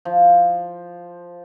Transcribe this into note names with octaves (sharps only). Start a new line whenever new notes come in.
F3